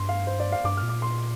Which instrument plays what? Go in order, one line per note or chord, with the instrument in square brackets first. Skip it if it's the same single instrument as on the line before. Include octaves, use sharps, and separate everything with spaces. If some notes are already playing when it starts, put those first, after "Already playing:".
Already playing: [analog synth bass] G2 [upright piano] C6
[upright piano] F5
C5
D5
F5
[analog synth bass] G2 [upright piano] D6
[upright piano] F6
[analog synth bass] A#2
[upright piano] D6
C6